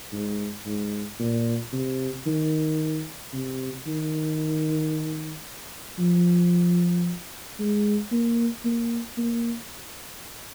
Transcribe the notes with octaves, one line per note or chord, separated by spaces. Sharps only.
G#2
G#2
A#2
C3
D#3
C3
D#3
F3
G#3
A#3
A#3
A#3